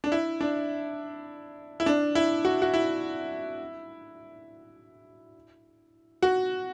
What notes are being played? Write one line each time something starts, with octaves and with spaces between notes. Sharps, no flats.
D4
E4
D4
E4
D4
E4
F#4
F#4
E4
F#4